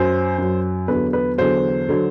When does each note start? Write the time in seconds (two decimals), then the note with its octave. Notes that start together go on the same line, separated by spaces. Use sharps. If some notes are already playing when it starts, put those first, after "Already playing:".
Already playing: F#2 F#3 C5
0.38 F#2 F#3
0.88 E2 D3 F#3 B4
1.13 B4
1.38 E2 D3 F#3 C5
1.89 D3 F#3